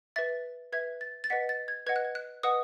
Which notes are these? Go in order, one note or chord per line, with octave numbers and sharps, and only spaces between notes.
B4 E5 A6
B4 E5 G#6
A6
A6
B4 D#5 F#5 B6
A6
G#6
B4 D#5 F#5 G#6
F#6
G#6
F#6
B4 D#5 F#5 D#6